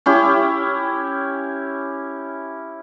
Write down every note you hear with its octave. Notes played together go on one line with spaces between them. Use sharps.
C#4 E4 G4